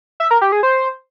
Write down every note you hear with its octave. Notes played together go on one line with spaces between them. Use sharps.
E5
A#4
G4
G#4
C5